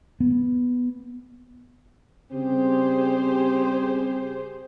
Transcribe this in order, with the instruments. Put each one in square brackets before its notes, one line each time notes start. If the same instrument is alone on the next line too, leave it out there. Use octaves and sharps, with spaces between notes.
[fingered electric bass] B3
[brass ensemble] C#3 G3 C4 [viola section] G4 G#4 C5